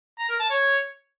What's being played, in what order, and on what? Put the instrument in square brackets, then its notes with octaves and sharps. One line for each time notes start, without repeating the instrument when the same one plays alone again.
[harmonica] A#5
A#4
A5
C#5